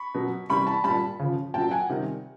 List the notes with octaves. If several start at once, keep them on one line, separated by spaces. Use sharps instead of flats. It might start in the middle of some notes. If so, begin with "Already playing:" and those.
Already playing: B5 C#6
B2 F#3
C3 E3 G3 B5 C#6
A5 B5
A#2 G3 A5 B5
C#3 F3
A#2 F#3 G5 A5
F#5 G#5
C3 D#3 G3